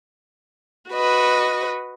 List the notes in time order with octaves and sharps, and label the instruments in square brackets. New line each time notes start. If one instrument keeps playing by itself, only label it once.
[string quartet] F#4 B4 D#5